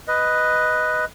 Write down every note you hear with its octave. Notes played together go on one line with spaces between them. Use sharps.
B4 D#5